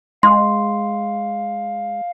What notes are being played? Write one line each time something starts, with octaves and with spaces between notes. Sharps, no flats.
G#3 F5 C6